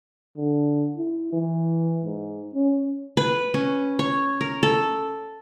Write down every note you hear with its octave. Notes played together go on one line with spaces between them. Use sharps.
D3
E4
E3
G#2
C#4
B4
C#4
C#5
A#4
A4